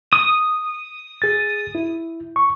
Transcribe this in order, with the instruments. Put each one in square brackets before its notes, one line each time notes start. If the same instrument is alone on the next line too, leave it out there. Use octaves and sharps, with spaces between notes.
[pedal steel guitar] D#6
[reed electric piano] G#4 A6
E4
C#6